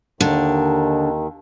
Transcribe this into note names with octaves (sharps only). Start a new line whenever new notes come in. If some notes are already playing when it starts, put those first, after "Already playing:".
D#2 D3 D#3